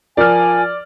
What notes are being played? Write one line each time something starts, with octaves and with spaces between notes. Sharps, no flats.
F3 A#4 D5 G#5 F6